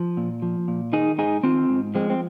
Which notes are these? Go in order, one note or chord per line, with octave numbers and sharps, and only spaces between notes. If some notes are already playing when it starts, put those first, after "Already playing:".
Already playing: F3
A#2
F3
A#2
D#3 D#4 G#4
G#2 D#4 G#4
D#3 C4 F4
G#2
F3 G#3 C4
C4